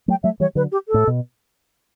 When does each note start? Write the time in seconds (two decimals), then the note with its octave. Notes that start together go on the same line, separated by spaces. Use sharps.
0.08 F#3 A3 G5
0.23 F#3 A3 E5
0.40 E3 G3 C#5
0.55 D3 F#3 B4
0.72 G4
0.88 A4
0.94 A2
1.07 B2